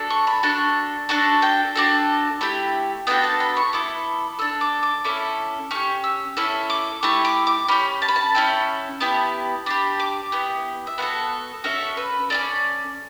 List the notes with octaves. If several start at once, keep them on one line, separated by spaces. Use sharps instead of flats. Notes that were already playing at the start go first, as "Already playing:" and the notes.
Already playing: D4 F#4 A4
C#6
B5
D4 F#4 A4 C#6
D4 F#4 A4 C#6
G5
D4 F#4 A4
A3 E4 G4
B3 D4 F#4 A4 G5
A5
B5
C#6
B3 E4 A4 D6
D4 A4 E6
D6
D6
C#4 E4 A4 D6
C#4 G4 C#6
E6
C#4 E4 A4 E6
D6
A3 E4 G4 C#6
D6
D6
C#4 G4 B5
A5
B5
A5
C#4 E4 A4 G5
B3 E4 G4 A5
D4 G4 B5
D6
B3 E4 G4
E5
B3 F#4 A4 F#5
C#4 F#4 A4 E5
B4
C#4 E4 A4 D5